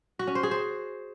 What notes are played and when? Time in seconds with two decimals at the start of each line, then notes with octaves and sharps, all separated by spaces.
0.19 F#4
0.27 C#4
0.35 C5
0.43 G#4
0.51 C5